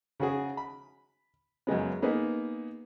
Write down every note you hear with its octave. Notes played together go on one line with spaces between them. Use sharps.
C#3 F#4 G#4
B5
F#2 C#3 G#3 B3
A#3 B3 D#4 G#4 B4